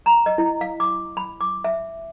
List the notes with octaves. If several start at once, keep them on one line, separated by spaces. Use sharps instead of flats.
A#5
D#5
E4
F5
D6
B5
D6
E5